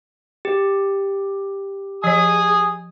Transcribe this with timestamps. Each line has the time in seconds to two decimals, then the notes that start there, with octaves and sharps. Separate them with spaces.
0.45 G4
2.04 F3 C#5 G#5 D#6